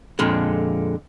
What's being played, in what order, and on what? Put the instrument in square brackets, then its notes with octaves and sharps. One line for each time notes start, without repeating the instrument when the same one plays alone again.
[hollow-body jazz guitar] F2 A#2 D3 G#3